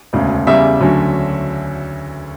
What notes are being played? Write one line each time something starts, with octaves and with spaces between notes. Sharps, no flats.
E1 D2 C#3
E2 C#3 G3 E5
D2 D3 F#3 C#4